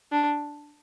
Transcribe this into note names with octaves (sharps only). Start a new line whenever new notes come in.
D4